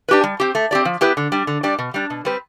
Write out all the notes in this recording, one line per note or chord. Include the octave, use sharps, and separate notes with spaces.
D4 G4 B4
G3
C4 G4
A3
C4 G4 D5
F3
B3 E4 G4 B4
D3
G3 D4
D3
G3 D4 G4 D5
B2
G3 D4
B2
G3 C4 G4 B4